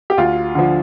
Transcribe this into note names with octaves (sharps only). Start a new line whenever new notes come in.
G4
D2 F4
D3 F3